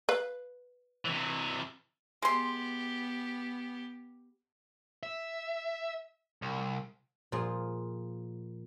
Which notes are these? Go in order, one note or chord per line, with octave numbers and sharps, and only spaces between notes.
B4 F5
C3 E3
G#3 B3 G4 C6
E5
C2
A#2 F3 F4 G#4